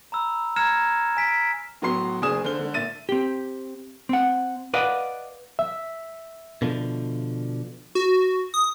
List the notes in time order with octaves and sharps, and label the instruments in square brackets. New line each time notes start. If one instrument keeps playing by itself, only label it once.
[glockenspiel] A#5 B5 E6
A#5 F6 G#6 A#6 C#7 E7
G#5 B6 D7
[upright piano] A2 F#3 B3 F#4 C6 C7
F#1 D4 G#4 G#5 D#6 E7
D3 C5 F6 G7
G#1 D3
A#2 E5 A6 D#7
[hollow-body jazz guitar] C4 G4
C4 F#5
B4 D5 D#5 F5 F#5
[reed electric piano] E5
[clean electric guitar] B2 D3 F3
[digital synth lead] F#4
D#6